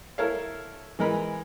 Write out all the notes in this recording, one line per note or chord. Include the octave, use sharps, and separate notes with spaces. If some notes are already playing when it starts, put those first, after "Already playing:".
E4 A4 A#4 C#5 F5
E3 G#3 A#4 B5